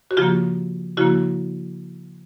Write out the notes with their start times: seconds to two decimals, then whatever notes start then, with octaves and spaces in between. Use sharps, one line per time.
0.11 F#4
0.17 C#3 F3 A#3 F4 G4
0.97 C#3 F3 A#3 E4 F#4